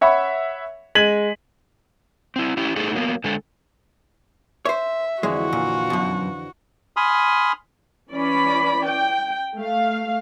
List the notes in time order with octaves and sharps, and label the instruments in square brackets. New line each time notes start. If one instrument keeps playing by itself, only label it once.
[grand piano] C#5 E5 F#5 B5 C#6
G#3 G#6 B6 D#7 F#7
[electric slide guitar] C4 E4
C#4 E4 G4
A3 D#4 G#4 A4
F#3 A#3 B3
D3 G#3 A4
[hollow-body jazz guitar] C5 C#5 [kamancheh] E5
[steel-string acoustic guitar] F2 D3 E3 [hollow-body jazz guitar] G#3 [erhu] F#4
[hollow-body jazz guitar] A#2 [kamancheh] F4
[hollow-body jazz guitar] F#2 B2
[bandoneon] G#5 B5 C6 D#6 F6
[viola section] E3 C#4 D5 B5
G5
A3 F5